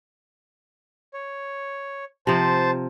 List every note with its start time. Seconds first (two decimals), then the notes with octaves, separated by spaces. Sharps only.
1.14 C#5
2.27 C3 F3 C5 A5